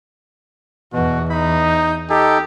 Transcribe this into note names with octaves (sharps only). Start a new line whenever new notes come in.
E2 B2 F#4
D#4 B5
G6
D#4 G4 A4